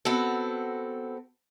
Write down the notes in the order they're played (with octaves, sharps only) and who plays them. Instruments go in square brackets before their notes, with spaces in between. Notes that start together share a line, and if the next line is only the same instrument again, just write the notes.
[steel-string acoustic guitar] B3 C4 F#4 A4